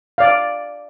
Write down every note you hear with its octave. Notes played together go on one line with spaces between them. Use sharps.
D5 F5